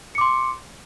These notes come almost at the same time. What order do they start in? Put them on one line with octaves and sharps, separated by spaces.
C#7 D6 C6